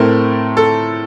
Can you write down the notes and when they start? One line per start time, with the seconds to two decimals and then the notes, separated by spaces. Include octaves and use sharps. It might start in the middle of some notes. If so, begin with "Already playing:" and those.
Already playing: A2 A3 C4 A#4
0.57 A4